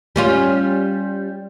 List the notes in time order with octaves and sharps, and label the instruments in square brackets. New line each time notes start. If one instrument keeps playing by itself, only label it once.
[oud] G3 C#4 F4